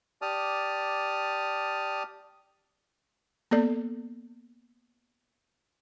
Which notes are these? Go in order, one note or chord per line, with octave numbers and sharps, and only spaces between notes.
G4 D5 A5 D#6 F6
A#3 B3 A4 D5